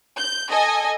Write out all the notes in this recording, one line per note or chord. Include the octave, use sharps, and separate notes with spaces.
G6
A4 D#5 G#5